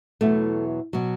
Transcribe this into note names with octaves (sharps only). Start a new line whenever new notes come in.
E2 B2 F#3 A3
B2 F#3